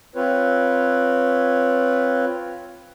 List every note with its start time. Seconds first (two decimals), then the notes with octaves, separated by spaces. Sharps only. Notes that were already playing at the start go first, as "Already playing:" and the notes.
0.15 C4 F4 B4 C#5